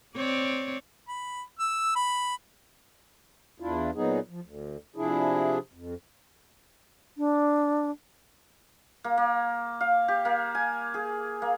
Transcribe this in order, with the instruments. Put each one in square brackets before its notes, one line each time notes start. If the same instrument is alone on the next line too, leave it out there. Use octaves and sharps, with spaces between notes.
[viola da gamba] C4 C#5 D5
[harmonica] B5
E6
B5
[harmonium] E2 D4 E4 F4
A#2 F#3 B3 D#4 G#4
F3
D2
C3 F3 D4 E4 G#4
F2
[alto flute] D4
[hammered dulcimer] A#3
A#3
F5
G4
A#3
G#5
G#4
A#3